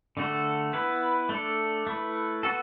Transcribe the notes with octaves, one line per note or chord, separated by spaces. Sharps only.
D3 A3 F#4 A4
B3 E4 B4
A3 D4 A4
A3 E4 B4
B3 F#4 A4